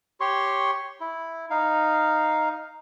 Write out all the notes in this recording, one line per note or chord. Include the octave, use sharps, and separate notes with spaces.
G4 C#5 C6 C#6
E4
D#4 F5